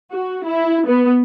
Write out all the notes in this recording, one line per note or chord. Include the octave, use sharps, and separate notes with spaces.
F#4
E4
B3